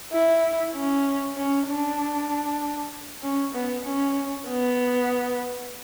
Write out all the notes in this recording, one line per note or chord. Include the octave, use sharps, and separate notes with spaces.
E4
C#4
C#4
D4
C#4
B3
C#4
B3